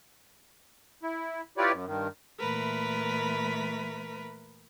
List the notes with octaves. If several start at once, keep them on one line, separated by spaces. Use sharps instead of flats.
E4
E4 F4 G4 B4 C#5 D5
F#2
G2 D#3
A#2 E3 A3 A#4 B4 B5